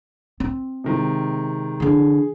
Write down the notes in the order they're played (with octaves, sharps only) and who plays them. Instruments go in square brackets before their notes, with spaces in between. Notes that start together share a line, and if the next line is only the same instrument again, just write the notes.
[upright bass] C4
[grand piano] C3 D#3 G#3
[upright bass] D3 E3 [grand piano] G#4